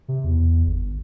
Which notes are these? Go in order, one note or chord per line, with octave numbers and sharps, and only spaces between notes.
C3
E2
G1